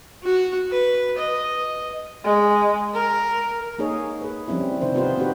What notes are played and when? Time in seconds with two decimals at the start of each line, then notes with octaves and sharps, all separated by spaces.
0.23 F#4
0.71 B4
1.19 D#5
2.24 G#3
2.94 A#4
3.79 A#3 D#4 G#4 C#5
4.21 G#4 B4
4.48 F3 G3 C4 C#4 E4
4.81 C3 D#3 E4 C5
4.94 B3 D#4 F4 G4 B4 C5
5.17 B3 C4 D#4 F#4 G4 B4